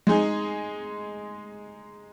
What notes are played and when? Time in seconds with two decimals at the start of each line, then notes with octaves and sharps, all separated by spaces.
0.07 G#3 D#4 G#4